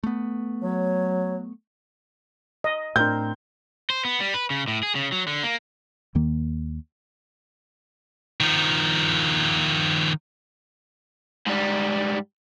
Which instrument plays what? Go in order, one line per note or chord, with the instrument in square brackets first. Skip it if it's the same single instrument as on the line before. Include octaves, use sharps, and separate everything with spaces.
[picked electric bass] A3 B3
[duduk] F#3 [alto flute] C#5
[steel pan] D#5
[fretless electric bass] A2 D4 [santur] C4 A#4 C6 [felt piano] G6
[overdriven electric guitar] C5
B3
G3
B4
C#3
A2
G#4
C#3
F#3
D3
A#3
[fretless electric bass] D#2 D#3 A#3
[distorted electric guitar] D#3 F3
[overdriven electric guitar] G#2 G3